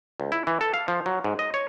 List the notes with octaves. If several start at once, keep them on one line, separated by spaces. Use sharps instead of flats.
C#2
E4
E3
A4
F5
F3
F#3
G#2
D#5
C#5